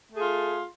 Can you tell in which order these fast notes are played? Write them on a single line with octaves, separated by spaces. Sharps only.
A3 G#4 F4